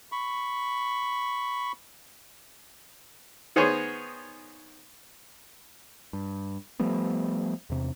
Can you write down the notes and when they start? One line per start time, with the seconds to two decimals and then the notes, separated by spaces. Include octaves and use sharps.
0.12 B5 C#6
3.56 D#3 B3 G#4 C5 C#5
6.13 G2
6.80 F3 G3 A3 B3
7.70 E2 C3